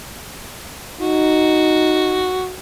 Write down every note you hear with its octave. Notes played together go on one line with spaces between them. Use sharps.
D#4 F#4